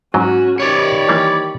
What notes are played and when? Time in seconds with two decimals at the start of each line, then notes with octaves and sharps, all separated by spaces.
0.14 G#2 F#3 C#4 F#4 D#5
0.60 D#3 G4 C#5 D5 B5
1.09 E3 G3 A#3